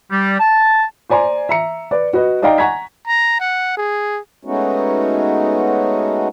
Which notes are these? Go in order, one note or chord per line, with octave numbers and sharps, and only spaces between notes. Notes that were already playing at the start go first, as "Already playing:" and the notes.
G3
A5
C5 D5 G#5 A#5 C6
E5 A#5 C#7
B4 D5
F#4 B4 D#5
D#4 D5 D#5 F5 G5 A#5
F#5 G#5 A#5 C#6 G#6 B6
A#5
F#5
G#4
G#3 A3 B3 C#4 D#4 F#4